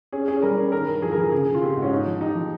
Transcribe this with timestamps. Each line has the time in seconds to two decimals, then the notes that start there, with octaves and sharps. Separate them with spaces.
0.12 C#4 G#4
0.28 C#4 G#4
0.42 G3 A#4
0.57 C#4
0.72 D#3 A#4
0.88 G2
1.02 F3 G#4
1.12 A#4
1.18 F3 G#4
1.31 C#3 G#4
1.47 C#3
1.55 F4
1.61 C4 G4
1.76 G#2
1.82 C#4
1.91 G#2 D#4
2.07 F3
2.21 D#4 G4
2.35 F3